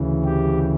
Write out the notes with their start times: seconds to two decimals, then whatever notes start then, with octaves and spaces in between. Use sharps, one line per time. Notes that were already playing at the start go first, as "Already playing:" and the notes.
Already playing: D2 C#3 E3
0.25 G4